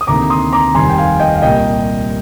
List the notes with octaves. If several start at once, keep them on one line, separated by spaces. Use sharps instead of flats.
D#6
D2 C3 D#3 A#3 A#5 D6
C6 D#6
A#5 D6
F1 D#2 D#3 G3 C4 G#5 C6
G5
F5 G#5
D#5 G5
F5
C2 A#2 G3 A#3 D#5 G5